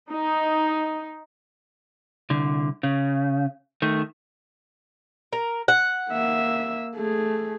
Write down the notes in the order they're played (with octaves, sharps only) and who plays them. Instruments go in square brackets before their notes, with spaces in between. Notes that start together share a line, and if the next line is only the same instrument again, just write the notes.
[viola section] D#4
[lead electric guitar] C2 D3
C#3
D#3 A3
[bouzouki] A#4
F#5
[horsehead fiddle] A#3 E5
A3 G#4